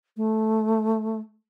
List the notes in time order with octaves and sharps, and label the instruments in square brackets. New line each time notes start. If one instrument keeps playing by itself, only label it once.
[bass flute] A3